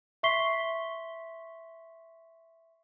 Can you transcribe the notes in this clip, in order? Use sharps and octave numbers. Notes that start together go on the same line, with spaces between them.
E5 C6 C#6 B6 C7 G7